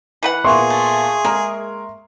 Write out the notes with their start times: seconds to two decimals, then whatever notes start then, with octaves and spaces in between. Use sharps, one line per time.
0.23 E3 B4 F#5
0.44 A#2 A#3 B3 G#4 E5 C6 C#6
0.70 A3
1.25 G#3 A#3 A#4